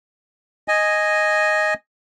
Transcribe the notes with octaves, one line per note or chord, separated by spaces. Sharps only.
D#5 G#5